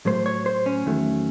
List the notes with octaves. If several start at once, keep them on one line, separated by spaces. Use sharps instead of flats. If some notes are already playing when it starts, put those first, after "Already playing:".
A2 F#3 A3 C5
C#5
C5
C#4
E2 D#3 F#3 A3